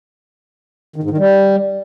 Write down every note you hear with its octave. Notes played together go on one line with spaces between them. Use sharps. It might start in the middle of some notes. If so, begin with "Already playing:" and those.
D#3
G#2
D#3
G3